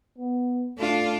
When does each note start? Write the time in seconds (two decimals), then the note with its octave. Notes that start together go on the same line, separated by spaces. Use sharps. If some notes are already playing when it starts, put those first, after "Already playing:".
0.18 B3
0.79 A3 D4 F4